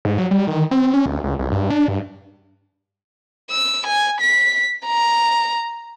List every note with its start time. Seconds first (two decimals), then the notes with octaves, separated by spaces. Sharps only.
0.05 G#2
0.18 F#3
0.31 G3
0.47 D#3
0.71 C4
0.94 C#4
1.06 D2
1.24 C#2
1.39 C2
1.52 G2
1.70 D4
1.88 G2
3.51 E6
3.87 G#5
4.21 B6
4.86 A#5